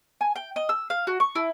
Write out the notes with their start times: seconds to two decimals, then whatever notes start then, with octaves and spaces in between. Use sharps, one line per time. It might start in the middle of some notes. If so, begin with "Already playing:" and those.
0.21 G#5
0.36 G5
0.56 D#5
0.69 E6
0.90 F5
1.07 F#4
1.20 C#6
1.35 E4